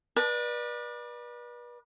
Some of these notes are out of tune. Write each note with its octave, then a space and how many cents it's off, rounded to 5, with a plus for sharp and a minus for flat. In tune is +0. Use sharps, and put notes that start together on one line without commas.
B4 -35 D5 +30